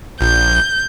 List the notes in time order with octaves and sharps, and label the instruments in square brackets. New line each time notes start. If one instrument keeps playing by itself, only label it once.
[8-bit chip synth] A#1 [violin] G6